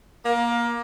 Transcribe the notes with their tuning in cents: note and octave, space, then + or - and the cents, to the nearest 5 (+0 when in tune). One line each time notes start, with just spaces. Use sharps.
A#3 +20